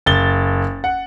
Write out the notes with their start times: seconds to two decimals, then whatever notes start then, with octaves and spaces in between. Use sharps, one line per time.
0.06 F#1 A6 G7
0.84 F#5